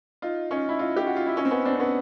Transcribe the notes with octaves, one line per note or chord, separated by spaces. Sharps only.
D#4 F4
C#4 D#4
E4
D#4 F4
G4
F#4
F4
E4
C#4 D#4
C4
B3 C#4
C4 D4
C4
B3 C#4